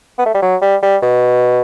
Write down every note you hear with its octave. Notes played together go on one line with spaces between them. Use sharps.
B3
A3
G3
F#3
G3
G3
B2